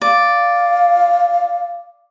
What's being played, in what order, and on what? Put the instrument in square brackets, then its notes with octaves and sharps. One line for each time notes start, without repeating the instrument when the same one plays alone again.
[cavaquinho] D5 [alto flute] F5